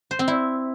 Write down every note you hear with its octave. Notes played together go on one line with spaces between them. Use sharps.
C5
C4
E4